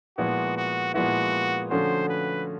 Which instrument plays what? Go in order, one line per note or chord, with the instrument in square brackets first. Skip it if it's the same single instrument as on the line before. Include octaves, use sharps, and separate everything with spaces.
[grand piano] A#2 F3 G#3 B3 E4 [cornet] F#4
[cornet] F#4
[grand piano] A#2 F3 G#3 B3 E4 [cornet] F#4
[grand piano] D3 F3 A3 C#4 F#4 [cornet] C5
[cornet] B4